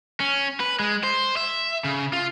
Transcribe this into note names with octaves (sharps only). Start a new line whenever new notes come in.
C#4
B4
G#3
C5
E5
C#3
F4